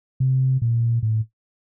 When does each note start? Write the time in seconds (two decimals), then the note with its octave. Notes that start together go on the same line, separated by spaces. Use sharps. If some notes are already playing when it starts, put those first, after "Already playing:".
0.20 C3
0.62 A#2
1.03 A2